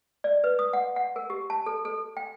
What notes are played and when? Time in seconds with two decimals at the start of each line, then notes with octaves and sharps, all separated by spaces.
0.24 D5
0.44 B4
0.59 D#6
0.73 F#5
0.96 F#5
1.16 A#4
1.30 G4
1.50 A5
1.66 A4
1.85 A4
2.17 G5